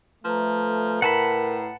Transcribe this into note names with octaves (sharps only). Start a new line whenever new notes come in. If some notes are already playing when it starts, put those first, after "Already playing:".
F3 A3 B4 A#5
A2 A#4 F#5 A5 B5